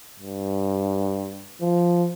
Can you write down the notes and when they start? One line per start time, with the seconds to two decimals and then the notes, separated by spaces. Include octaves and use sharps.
0.19 G2
1.61 F3